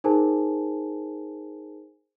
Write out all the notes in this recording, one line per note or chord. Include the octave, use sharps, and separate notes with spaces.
D#4 G#4 A#4 C5 G#5 A5